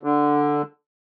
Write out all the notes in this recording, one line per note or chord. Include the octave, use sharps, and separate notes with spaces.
D3